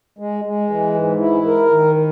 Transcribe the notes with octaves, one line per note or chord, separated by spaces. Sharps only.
G#3
G#3
E3
G#2
E4
A#4
D#3